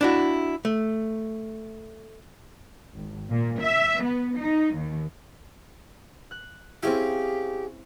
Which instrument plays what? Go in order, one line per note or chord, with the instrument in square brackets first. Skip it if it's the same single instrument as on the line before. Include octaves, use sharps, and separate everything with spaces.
[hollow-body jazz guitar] D4 E4 F#4
A3
[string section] G#1
A#2
E5
B3
D#4
D#2
[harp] F#6
[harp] C4 C#4 E4 [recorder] G4 [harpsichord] G#4 F5